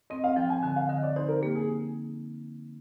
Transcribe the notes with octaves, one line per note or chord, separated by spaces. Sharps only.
C4 D#5
F5
F3 G5
G#5
D3 G#5
F5
D3 D#5
D5
D#4 C5
A#4
A#3 G4
G#4